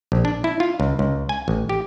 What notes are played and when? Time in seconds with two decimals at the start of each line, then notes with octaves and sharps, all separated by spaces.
0.12 A#1
0.25 D4
0.44 E4
0.60 F4
0.80 C#2
0.99 C#2
1.29 G#5
1.48 A1
1.69 G4